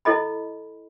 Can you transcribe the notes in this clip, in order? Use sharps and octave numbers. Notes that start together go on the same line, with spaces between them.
E4 A4 D#5 B5